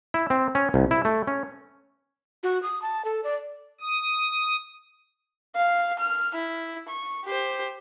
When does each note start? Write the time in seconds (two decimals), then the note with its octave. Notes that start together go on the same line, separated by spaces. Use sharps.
0.14 E4
0.30 C4
0.55 C#4
0.74 C2
0.91 E4
1.05 A3
1.27 C#4
2.43 F#4
2.63 D#6
2.82 A5
3.05 A4
3.24 D5
3.81 D#6
5.55 F5
5.99 F6
6.35 E4
6.88 C#6
7.25 G4 C5